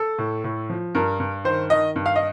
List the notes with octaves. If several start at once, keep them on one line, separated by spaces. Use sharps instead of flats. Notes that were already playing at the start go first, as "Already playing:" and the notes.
Already playing: A4
A2
A2
F3
G2 A#4
G2
D#3 C5
D#3 D#5
G2
F5
D#5